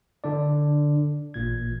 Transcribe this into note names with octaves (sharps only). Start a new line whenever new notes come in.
D3 D4 D5
A1 A#2 G#6